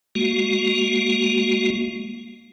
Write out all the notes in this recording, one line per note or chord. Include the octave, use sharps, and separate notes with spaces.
G#3 A#3 F#4